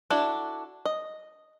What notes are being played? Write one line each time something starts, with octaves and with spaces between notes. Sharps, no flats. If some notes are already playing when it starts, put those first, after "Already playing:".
D4 E4 F#4 A4
D#5